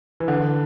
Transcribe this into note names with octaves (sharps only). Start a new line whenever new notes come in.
E3
D3